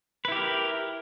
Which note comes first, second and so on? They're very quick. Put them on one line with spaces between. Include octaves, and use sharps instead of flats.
B4 E4 G4 A#4